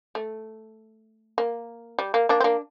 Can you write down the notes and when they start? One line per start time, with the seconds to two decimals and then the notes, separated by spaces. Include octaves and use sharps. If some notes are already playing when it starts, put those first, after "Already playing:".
0.15 A3
1.38 A#3
1.99 G3
2.14 A#3
2.29 A#3 D4
2.40 C4
2.44 A#3 D4